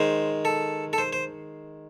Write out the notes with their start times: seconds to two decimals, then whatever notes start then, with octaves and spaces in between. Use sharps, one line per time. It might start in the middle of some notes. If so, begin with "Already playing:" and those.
Already playing: D#3 G#3 C5
0.45 A4
0.93 A4
0.98 C5
1.13 C5